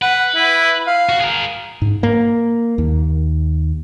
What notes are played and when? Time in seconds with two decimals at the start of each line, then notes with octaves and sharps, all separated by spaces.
0.02 B4 F#5
0.35 E4
0.87 F5
1.09 F#4
1.21 G#4 A#4
1.82 G#2
2.03 A#3
2.78 D#2